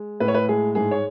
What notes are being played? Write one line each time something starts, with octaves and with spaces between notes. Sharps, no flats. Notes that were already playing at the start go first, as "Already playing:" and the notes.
Already playing: G#3
A2 B4
C#5
B4
G#3 G#4
G#2 G#4
C#5